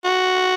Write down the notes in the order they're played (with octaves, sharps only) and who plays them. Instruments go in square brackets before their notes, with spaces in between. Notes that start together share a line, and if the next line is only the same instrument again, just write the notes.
[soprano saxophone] F#4